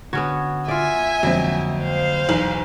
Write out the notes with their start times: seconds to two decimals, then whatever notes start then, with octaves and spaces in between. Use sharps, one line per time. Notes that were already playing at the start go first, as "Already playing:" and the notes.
0.13 D3 B3 C#4 F#4 G#6
0.68 F4 D5 E5 G#5
1.23 F2 D3 F#3 G#3 A#3 C4
1.82 C5 F5
2.29 B1 E2 F#7